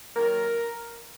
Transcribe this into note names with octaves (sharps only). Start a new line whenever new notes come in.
D#3 F#3 A#3 A#4